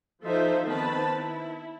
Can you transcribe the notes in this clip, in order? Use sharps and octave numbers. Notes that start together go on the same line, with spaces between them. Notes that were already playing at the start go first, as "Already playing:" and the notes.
F3 D#4 F4 A4 C5 E5
D#3 B3 C4 B4 A5 B5
E4